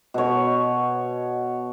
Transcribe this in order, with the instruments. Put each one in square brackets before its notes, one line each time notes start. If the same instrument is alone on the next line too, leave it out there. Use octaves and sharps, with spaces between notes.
[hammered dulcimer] B2 C#5